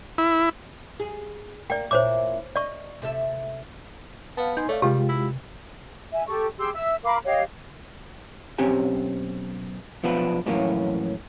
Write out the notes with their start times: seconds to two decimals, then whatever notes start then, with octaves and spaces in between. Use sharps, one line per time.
0.18 E4
1.00 G#4
1.70 A#3 D5 G5
1.91 A#2 E4 C5 C#5 D6
2.56 D5 D#5 C#6
3.02 C3 A4 E5
4.37 B3 F5 A5
4.57 D#4 G#5 C6 G6
4.69 A3 C#5 D5 F5
4.82 C3 G3 G#3 F4 G4
5.09 E4
6.12 E5 G#5
6.27 G4 A4 C#6
6.59 G4 G#4 C6 E6
6.75 E5 E6
7.04 A#4 F5 B5 D6
7.24 G4 C#5 D#5 F5
8.58 B1 C4 C#4 G4 G#5
10.03 B1 F3 B3 D4 B4
10.46 F2 A2 E3 F#3 A#3 C#4